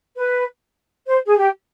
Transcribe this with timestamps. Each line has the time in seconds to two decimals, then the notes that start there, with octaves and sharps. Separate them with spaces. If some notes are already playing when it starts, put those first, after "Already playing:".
0.17 B4
1.07 C5
1.26 G#4
1.37 G4